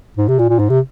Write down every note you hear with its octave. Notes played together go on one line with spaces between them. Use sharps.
G#2
C3
A#2
A#2
G#2
C3